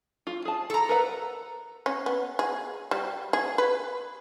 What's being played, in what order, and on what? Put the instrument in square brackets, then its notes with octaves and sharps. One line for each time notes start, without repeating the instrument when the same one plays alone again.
[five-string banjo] F4
G#4 A5
[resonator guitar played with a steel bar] A4 A#5
[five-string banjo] A#4 B4 F#5
[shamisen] C#4
B3
G#4
G3
G#4
B4